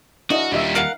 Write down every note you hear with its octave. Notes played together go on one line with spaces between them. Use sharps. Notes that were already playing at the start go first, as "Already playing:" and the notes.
D4 E4 F#4 D#5 F6
D#2 G3 D4 D#5 E5
A#4 F5 F#5